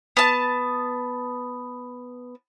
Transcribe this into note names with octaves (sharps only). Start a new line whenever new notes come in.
B3 A5